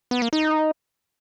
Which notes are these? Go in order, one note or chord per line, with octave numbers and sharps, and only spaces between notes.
B3
A#3
D#4